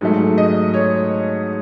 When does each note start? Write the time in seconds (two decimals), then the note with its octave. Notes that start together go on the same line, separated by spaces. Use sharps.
0.01 G#2 F#3 A3
0.38 D#5
0.74 C#5